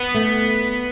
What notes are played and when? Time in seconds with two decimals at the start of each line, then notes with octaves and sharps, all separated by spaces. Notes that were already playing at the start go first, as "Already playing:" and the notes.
Already playing: B3
0.14 A3